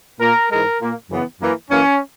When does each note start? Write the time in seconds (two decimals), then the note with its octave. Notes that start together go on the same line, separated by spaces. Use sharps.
0.20 A#2 A#3 A#4
0.50 G#2 E3 G#3 A#4
0.81 A#2 A#3
1.10 F#2 C#3 E3 B3
1.40 F#2 E3 A#3
1.70 F#2 E3 A#3 C#4